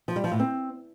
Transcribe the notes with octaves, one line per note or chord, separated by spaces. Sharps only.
F3
G3
F3
A2
C4